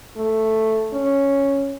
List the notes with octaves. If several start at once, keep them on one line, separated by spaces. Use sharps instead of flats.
A3
C#4